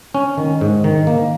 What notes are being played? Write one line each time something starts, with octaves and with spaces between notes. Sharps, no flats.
C#4
D#3
G#2
D#3
A#3